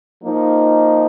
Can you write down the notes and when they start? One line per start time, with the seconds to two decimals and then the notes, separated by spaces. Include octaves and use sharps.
0.22 F3 A#3 D#4